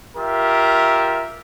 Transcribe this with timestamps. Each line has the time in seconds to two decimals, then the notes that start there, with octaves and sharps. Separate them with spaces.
0.16 F4 G4 A#4 E5